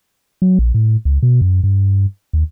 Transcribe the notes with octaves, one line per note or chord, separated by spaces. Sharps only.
F#3
A#1
A2
C#2
B2
F#2
G2
D#2